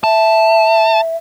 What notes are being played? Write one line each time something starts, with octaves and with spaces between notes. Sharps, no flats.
E5 A5